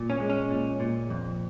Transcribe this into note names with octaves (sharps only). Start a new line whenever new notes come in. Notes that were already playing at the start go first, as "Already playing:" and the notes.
Already playing: A#2
C#4
G#3
C#4
A#2
A#2
F2